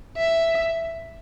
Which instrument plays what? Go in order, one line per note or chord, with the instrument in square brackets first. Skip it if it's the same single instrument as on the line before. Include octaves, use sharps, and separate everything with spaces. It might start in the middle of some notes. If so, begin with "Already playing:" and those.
[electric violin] E5